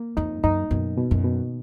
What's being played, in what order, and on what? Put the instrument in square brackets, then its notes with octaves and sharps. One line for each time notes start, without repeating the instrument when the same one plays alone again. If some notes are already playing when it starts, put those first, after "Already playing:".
Already playing: [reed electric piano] A#3
[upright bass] F2 [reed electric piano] D#4
[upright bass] F#2 [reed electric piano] D#4
[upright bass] F#2 [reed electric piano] B2
[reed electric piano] B2
[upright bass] F#2
[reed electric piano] B2